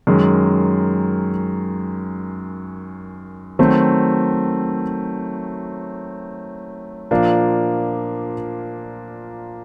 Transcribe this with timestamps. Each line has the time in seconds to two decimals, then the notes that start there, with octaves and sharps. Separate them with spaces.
0.07 F#2 D#3 G#3
3.59 D#3 F#3 A3 C4
7.11 A#2 F3 A#3 D4